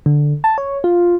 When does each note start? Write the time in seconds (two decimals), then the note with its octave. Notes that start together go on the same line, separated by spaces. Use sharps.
0.06 D3
0.44 A5
0.58 C#5
0.84 F4